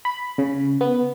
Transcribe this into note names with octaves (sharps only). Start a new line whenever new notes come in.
B5
C#3
B3